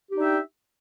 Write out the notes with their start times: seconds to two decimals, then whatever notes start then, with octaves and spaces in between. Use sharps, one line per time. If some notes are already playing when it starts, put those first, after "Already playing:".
0.10 G4
0.13 D#4
0.17 D4
0.21 E5
0.24 G5